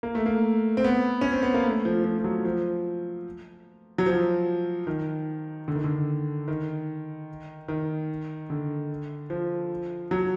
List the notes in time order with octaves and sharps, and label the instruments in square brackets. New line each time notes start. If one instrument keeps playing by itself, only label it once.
[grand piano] A#3
A3
A#3
C4
B3
C#4
C4
B3
A#3
A3
F3
F3
F3
F#3
F3
F#3
F3
D#3
D3
D#3
D3
D#3
D#3
D3
F3
F#3